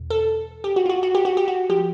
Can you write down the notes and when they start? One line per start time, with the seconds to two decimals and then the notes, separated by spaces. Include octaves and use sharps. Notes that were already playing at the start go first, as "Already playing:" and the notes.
Already playing: E2 B2
0.10 A4
0.64 G4
0.76 F#4
0.86 F4
0.89 F#4
1.03 F#4
1.15 G4
1.25 F#4
1.37 G4
1.48 F#4
1.70 F3 G4